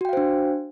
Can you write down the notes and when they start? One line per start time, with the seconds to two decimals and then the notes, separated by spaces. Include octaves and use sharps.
0.01 F#4
0.05 G5
0.09 F5
0.13 C5
0.17 D4